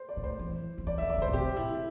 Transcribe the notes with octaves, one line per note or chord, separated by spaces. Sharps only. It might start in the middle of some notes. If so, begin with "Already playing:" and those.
Already playing: C5
D5
A2
C5
E3
D3
E3 D5
E3 E5
C3 D5
D3 C5
A2
C3 G4
E4
E4